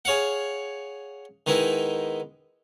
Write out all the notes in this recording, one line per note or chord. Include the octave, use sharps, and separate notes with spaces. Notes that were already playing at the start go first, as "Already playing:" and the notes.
G#4 C#5 F5 F#5
D#3 G#3 B3 D#4 E4